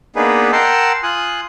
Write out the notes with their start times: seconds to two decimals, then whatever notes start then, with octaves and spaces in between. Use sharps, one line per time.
0.16 A#3 B3 D4 D#4 G#4 B4
0.52 A#4 F#5 G5 A5 C6 E6
1.03 F4 G#5 D#6 F#6